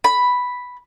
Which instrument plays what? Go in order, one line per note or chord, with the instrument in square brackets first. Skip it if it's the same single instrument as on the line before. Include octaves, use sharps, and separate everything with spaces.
[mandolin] B5